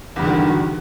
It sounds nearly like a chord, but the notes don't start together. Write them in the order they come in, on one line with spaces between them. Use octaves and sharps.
E2 G2 D3 D#3 F#3